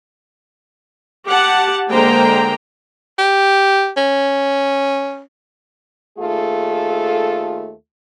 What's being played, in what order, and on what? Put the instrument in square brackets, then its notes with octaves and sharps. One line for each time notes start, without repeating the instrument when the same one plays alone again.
[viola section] G4 F#5 A5
D3 G#3 A#3 C5 G5 A#5
[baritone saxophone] G4
C#4
[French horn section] D#2 A3 F4 G#4 A4